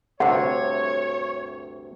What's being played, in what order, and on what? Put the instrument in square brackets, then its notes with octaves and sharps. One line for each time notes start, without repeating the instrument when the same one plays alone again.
[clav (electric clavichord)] D2 G2 C3 [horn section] C#5 [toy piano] F#5